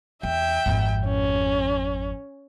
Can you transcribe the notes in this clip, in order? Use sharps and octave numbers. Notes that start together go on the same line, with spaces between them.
E2 E5 G5
G#1 F2
C#4